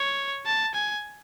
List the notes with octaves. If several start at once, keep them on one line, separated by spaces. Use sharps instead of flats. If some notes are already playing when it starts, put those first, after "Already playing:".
Already playing: C#5
A5
G#5